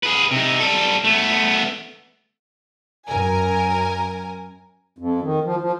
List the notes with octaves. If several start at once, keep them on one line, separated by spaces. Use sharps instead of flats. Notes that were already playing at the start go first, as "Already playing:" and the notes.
G#4 B4
C3 D#4
G3 A4
A3 B3
F#2 A#4 G#5
F2
D#3
F3
F3